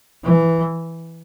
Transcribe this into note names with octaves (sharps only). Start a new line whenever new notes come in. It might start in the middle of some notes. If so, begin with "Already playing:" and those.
E3